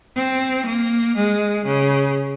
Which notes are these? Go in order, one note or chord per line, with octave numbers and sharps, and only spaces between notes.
C4
A#3
G#3
C#3